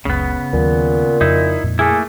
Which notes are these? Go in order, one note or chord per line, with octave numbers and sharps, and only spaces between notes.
F#1 C#2 C#3 B3
D#2 A#2 F#3
F2 C#3 D#4 E4
F2 A#2
A3 A#3 E4 G#4